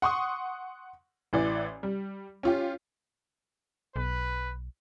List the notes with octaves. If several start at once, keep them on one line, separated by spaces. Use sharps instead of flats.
F#5 C6 C#6 D#6
A1 E3 D5
G3
C#4 F4 G4
B1 B4